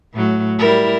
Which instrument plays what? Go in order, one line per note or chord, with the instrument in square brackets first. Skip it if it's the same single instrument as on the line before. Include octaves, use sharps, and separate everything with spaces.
[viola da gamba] A2 F#3
G3 E4 A#4